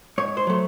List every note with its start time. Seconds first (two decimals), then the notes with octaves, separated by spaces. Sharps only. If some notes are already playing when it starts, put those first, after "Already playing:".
0.18 G#2 C#5
0.37 C5
0.47 F#3 A3